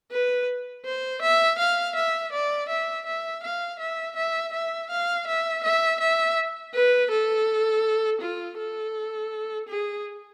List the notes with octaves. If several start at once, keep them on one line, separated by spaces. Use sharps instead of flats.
B4
C5
E5
F5
E5
D5
E5
E5
F5
E5
E5
E5
F5
E5
E5
E5
B4
A4
F4
A4
G#4